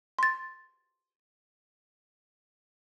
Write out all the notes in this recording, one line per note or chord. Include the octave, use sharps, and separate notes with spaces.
C6 A6